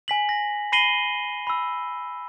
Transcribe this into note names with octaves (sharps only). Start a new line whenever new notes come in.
G#5 B6 F#7
A#6
B5 A#6 C7 D#7 F#7 G7
B5 E6